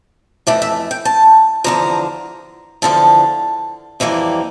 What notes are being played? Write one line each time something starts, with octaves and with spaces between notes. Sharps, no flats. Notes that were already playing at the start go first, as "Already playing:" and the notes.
F2 E3 A3 D5
E5
G5
A5
E2 D3 F3 A#5
E2 D3 F3 A5
F2 E3 G3 A#3